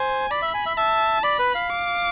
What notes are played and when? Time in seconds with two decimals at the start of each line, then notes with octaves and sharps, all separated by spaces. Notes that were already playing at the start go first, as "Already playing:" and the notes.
Already playing: C5 G#5
0.31 D5 B5
0.42 E5
0.54 G#5
0.66 E5
0.77 E5 A5
1.23 D5 B5
1.39 B4
1.55 F5
1.70 D6